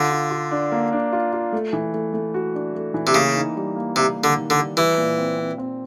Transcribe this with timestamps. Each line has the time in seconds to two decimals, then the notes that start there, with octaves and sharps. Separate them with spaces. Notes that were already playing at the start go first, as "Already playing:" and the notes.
Already playing: D3 F4
0.11 F4
0.31 F4
0.51 D4
0.72 A#3
0.93 D4
1.13 F4
1.33 F4
1.52 A3
1.73 E3
1.94 A3
2.14 A3
2.34 F#4
2.55 D4
2.75 A3
2.94 E3
3.07 C3
3.14 C#3 A#3
3.35 D#4
3.56 G3
3.76 A#3
3.96 C3 G3
4.16 A#3
4.24 D3
4.37 D#3
4.50 D3
4.57 G3
4.77 E3 G3
4.98 A#2
5.18 C4
5.38 C4
5.58 C4